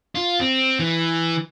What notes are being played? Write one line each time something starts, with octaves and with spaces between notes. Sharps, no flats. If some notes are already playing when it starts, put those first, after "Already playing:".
F4
C4
E3